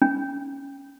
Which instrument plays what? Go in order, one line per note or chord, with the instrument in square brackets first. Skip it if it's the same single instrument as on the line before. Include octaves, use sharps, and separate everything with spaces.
[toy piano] C#4